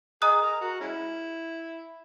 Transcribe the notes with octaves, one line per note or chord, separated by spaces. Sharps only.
G#4 D#5 A#5 D#6 F#6
A#4
F#4
G#3 C#4 E4